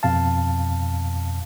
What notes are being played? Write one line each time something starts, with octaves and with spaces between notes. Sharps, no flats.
F2 B2 F5 A5